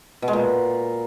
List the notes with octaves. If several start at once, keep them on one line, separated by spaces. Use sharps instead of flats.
B2
G#3
A#2